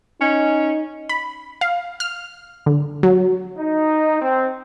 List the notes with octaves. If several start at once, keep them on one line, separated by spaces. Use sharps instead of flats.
C#4 D#4
B5
F5
F6
D3
F#3
D#4
C4